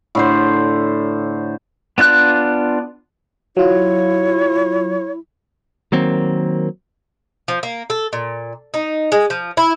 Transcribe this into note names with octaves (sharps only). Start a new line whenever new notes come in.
A2 D3 C5
B3 D4 F4 F#6
F#3 E4 F4 C#5
D#3 F#3 A#3 C4
F3
A#3
A4
A#2
D#4
G#3
F3
E4